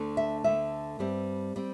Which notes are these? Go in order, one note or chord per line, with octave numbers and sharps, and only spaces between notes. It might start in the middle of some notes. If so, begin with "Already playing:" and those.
Already playing: D2 D3 A3
E5
D2 D3 A3 E5
G2 G3 C4
G3 C4